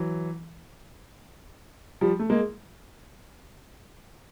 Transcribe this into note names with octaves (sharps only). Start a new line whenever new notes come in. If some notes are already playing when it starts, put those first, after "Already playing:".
Already playing: E3 F#3
F3 G3
A3
G#3 A#3